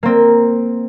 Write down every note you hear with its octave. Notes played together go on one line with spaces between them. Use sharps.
A#3 C4